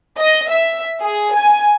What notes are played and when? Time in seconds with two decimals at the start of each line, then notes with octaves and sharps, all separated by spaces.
0.19 D#5
0.50 E5
1.02 G#4
1.34 G#5